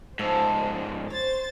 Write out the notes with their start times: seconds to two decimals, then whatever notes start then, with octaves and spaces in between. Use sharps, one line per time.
0.19 G#2 F3 A4 C5
1.10 C5 C#5 A6